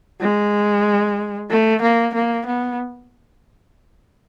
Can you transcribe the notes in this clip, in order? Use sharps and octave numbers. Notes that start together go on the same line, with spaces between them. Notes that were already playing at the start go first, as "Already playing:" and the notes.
G#3
A3
A#3
A#3
B3